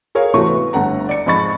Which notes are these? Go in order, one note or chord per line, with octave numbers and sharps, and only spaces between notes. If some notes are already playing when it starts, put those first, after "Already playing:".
G#4 A#4 C#5 F5
C3 E3 A3 F#4 C#6
B3
G1 D3 A3 F#5 A#5
D5 C#7
F2 G#2 D#5 B5 C#6 A6